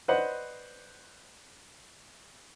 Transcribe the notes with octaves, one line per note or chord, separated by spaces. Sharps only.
B4 C5 D5 D#5 F#5